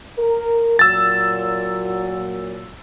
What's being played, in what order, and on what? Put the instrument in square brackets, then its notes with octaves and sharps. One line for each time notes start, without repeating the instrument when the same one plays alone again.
[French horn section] A#4
[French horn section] A#2 F#3 [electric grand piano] E6 A6